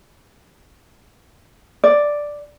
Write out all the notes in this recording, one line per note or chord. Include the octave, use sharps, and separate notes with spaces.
D5